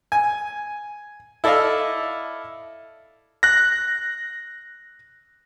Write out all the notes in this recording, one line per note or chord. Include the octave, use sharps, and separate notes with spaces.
G#5
E4 A4 D5 D#5 F5
F#6 A#6